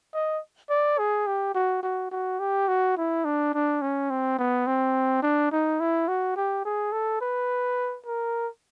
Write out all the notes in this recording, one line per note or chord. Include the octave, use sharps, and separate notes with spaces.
D#5
D5
G#4
G4
F#4
F#4
F#4
G4
F#4
E4
D4
D4
C#4
C4
B3
C4
D4
D#4
E4
F#4
G4
G#4
A4
B4
A#4